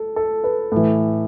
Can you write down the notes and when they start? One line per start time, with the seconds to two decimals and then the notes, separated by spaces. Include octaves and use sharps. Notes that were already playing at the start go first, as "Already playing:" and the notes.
Already playing: A4
0.16 A4
0.44 B4
0.72 A2 E3